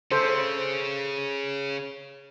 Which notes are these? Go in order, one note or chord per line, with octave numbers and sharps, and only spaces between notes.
C#3 A4 C5